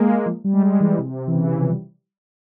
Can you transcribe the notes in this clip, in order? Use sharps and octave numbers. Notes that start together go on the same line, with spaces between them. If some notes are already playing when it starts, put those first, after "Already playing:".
Already playing: G#3 A#3
F3
G3
G#3
G3
E3
C3
E3
C#3
F3
G3